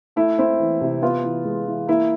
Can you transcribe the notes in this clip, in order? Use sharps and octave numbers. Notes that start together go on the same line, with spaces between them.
A3 E4
C4 E4
E3
C3
B3 F4
E3
G#3
E3
A#3 E4